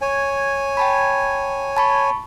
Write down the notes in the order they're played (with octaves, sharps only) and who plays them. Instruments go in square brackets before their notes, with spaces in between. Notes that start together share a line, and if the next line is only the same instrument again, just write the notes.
[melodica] C#5 G#5
[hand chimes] G5 A5 B5
A5 B5 C#6